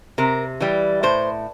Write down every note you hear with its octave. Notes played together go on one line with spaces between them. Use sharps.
C3 A#4
E3 G3
A2 C5